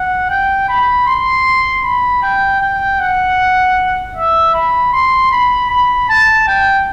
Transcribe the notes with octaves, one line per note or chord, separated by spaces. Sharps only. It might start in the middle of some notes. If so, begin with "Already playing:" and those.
Already playing: F#5
G5
B5
C6
B5
G5
G5
F#5
E5
B5
C6
B5
B5
A5
G5